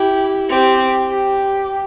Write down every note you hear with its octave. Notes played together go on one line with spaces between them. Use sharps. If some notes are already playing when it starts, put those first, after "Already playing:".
Already playing: E4 G4
C4 G4
G4